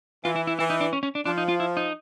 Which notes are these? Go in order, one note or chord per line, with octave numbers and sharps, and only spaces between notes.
E3 F4
E4
E4
E3 E4
D#4
D4
C#4
C#4
D4
F3 D4
D#4
F4
E4
D#4